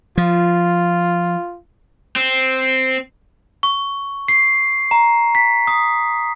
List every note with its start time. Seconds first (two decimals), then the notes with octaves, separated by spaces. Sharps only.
0.18 F3 F4
2.16 C4
3.63 C#6
4.28 C7
4.91 A#5
5.35 B6
5.67 D#6